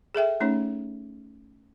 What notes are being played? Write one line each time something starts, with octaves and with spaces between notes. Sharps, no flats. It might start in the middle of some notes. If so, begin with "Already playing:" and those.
G#4 A4 E5 G5
A3 C#4 D#4 C#5